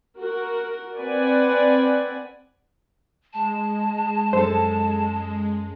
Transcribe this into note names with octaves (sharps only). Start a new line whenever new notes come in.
F#4 A#4
C4 B4 D5 F#5 G#5
G#3 A5
F#2 A4 C5